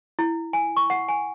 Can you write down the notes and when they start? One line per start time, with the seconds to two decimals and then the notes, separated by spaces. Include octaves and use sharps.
0.19 E4
0.53 G#5
0.77 C#6
0.90 F#5
1.09 G#5